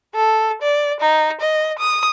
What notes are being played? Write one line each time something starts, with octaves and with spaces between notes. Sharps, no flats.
A4
D5
D#4
D#5
D#6